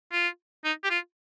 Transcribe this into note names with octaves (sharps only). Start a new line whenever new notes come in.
F4
D#4
G4
F4